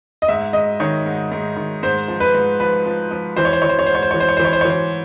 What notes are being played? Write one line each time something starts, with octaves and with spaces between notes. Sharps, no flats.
D#5
G#2 E5
G#2 D#5
D#3 C#5
G#2
G#2
D#3
G#2 C5
F3
B4
G#2
F3 B4
F3
F3
E3 C5
C#5
C5
E3 C#5
C5
C#5
G#2 C5
C#5
C5
E3 C#5
C5
C#5
E3 C5
C#5
C5
C#5
E3
C5